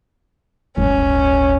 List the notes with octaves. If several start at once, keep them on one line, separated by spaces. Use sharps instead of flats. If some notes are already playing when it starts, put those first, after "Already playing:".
D1 G1 C#4